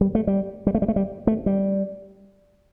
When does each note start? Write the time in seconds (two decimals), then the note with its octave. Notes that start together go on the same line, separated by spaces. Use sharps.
0.01 G3
0.15 A3
0.27 G3
0.67 G3
0.75 A3
0.82 G3
0.88 A3
0.96 G3
1.27 A3
1.46 G3